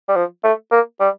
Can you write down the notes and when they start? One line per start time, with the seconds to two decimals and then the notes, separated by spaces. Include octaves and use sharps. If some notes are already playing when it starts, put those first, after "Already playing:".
0.09 G3
0.16 F3
0.44 A3
0.71 A#3
1.00 G3